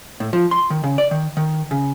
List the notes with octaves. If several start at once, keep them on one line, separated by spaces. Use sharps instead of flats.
A2
F3
C6
D#3
C#3
D5
D#3
D#3
C#3